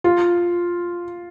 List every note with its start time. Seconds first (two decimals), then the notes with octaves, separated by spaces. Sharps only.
0.04 F4